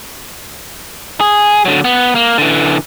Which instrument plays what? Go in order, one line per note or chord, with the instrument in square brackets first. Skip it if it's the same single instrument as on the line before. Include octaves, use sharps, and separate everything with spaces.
[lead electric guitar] G#4
D3 F#3
B3
A#3
D3 E3